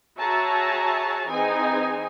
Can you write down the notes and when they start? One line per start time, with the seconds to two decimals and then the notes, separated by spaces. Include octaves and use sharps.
0.18 F#4 G#4 C#5 E5 A5 A#5
1.28 E3 C4 D#4 G#4 G#5